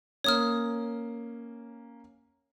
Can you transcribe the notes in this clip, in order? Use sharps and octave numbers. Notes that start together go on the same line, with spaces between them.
A#3 C#4 C#5 D#6 F6